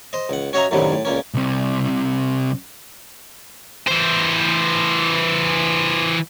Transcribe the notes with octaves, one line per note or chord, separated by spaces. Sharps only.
C5 D#5
C#2 F#5
C#4 F#4 C#5 D#5 E5 A#5
F#2 A2 C3 D#3 F#3 G3
A2
C#2 A#2 A#3 C#4
C2 C3
E3 C5